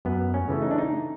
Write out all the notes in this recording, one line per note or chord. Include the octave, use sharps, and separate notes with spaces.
F#2 B3
C#4
C#3 E3 A3
D#4
D4
D#4